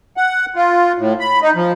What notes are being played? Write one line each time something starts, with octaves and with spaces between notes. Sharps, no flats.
F#5
F4
A2
B5
D#4
F3